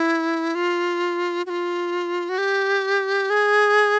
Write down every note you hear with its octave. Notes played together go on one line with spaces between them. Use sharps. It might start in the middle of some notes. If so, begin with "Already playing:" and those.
Already playing: E4
F4
F#4
F4
F#4
G4
G#4